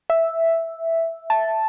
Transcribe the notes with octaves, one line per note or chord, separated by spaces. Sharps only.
E5
A5